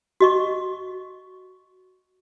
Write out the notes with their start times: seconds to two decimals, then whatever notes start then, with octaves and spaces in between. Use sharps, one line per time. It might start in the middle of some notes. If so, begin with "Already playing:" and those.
0.20 F#4 D#5 C#6